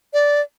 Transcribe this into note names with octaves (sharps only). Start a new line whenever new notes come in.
D5